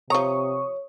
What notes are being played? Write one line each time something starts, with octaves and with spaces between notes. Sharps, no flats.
C3 F3 C#5 A#5 C#6 D#6